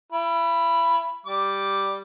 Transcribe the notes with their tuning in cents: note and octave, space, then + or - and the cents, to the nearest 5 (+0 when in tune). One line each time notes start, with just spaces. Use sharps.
E4 +40 B5 +0
G3 +0 D6 +0